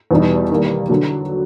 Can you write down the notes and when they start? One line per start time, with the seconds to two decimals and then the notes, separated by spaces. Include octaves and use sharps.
0.11 E2 B2 G3 B3 D#4
0.50 D#3 G3 A#3
0.90 D3 F#3